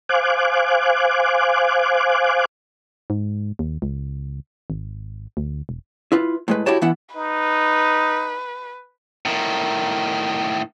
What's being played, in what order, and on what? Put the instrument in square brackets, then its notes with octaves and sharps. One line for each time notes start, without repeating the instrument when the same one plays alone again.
[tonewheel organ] C5 F5 G#5 D6 F#6
[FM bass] G#2
D#2
C#2
G#1
D2
E1
[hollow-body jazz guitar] E4 F4 B4
A2 G#3 B4
E4 F#4 G4 C#5 A5
E3 B3 E4 E5 F#5
[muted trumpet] D#4 [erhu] B4
[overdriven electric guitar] A2 D#3